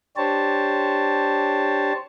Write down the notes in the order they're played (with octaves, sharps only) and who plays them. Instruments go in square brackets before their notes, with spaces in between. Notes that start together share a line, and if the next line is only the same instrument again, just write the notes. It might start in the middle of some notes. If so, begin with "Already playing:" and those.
[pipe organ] D4 G4 C5 C#5 A5